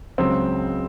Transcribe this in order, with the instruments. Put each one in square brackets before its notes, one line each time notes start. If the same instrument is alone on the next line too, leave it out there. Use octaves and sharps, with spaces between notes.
[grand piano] C#2 C#3 F#3 C4